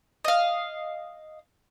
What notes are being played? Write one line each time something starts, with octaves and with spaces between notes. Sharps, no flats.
D#5 F5